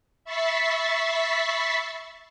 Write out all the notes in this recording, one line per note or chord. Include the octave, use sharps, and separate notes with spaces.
E5 B5 C#6 A6 B6 C7